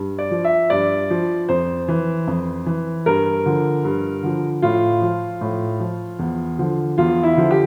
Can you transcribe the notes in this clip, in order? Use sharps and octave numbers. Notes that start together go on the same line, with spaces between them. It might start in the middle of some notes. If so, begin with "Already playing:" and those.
Already playing: G2
D5
F3
E5
G2 D5
F3
F2 C5
E3
F2
E3
G2 A#4
D3 F3
G2
D3 F3
A2 F4
F3
A2
F3
E2
D3 F3
E2 F4
E4
D3 F3
G4